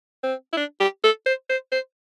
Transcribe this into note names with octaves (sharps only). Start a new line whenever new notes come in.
C4
E4
D4
G4
A4
C5
C5
C5